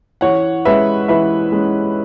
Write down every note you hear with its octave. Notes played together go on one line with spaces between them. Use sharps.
E3 C#5 F#5
G#3 C#4 B4 E5
E3 B4 E5
G#3 C#4